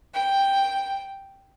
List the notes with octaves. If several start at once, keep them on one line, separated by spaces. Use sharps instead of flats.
G5